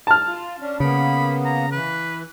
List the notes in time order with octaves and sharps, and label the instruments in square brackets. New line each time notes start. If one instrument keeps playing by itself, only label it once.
[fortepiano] A5 F6
[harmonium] F4
C#4 D4
[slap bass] C#3 [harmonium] A#3 B3 [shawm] B5
[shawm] A#5
[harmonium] E3 [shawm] B4